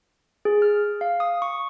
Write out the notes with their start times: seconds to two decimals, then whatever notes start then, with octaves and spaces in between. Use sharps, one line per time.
0.45 G#4
0.62 F6
1.01 F5
1.20 D#6
1.42 C#6